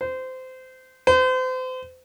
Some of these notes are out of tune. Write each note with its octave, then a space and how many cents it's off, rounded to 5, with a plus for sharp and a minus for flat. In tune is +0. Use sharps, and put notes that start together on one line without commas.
C5 -20
C5 -35